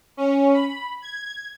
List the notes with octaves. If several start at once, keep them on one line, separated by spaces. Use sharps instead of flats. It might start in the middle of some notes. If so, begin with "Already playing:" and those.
C#4
B5
G#6